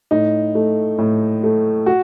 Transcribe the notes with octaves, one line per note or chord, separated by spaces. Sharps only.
A2 D#4
A3
A2
A3
F#4